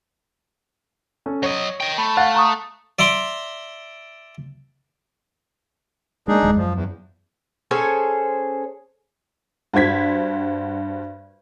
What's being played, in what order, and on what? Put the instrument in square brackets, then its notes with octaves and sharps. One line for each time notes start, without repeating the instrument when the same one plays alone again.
[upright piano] C#4 A4
[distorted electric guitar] F#3 D#5 [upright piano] C#5
[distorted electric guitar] D#5 G5
[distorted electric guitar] A3 [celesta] B5
[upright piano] F5 F#6 A6 [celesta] F#5
[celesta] A#5 C#6 D#6
[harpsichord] D5 E5 A#5 C6 D6
[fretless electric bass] G#3 A#3 [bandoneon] D4 D#4 G#4
[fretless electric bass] D#1 G2 G#3
[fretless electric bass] F#2 [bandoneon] F3
[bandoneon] E2
[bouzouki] C#4 G#4 A4 C5
[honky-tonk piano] G2 F#4 C5 G#6 B6